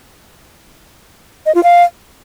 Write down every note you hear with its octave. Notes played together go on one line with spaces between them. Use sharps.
D#5
F4
F5